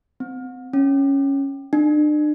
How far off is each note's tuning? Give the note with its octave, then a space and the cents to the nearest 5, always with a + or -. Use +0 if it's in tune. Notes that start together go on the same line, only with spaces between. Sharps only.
C4 -30
C#4 -5
D4 +40